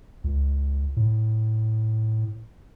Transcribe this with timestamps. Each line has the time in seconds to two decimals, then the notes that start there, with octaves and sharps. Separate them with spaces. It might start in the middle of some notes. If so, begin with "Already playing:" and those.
0.24 C#2
0.96 A2